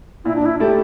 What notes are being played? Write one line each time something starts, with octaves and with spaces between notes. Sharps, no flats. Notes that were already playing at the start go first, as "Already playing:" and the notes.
A#2 E4
D4
E4
A3 E4 G4 A4